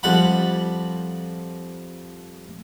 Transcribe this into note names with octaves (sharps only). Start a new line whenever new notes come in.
F2 G3 F#5 B5